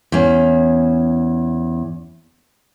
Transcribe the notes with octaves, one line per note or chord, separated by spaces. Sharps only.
E2 C#4